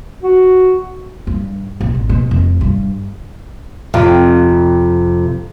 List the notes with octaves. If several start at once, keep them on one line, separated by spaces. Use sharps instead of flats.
F#4
G2
B1
G#1
B2
F1
G2
F2 C3